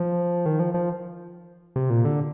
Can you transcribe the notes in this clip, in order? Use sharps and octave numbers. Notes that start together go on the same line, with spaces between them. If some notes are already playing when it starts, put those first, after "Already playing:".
Already playing: F3
D#3
F3
F3
C3
A#2
D3